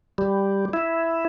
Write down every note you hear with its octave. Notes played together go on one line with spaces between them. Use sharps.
G3
E4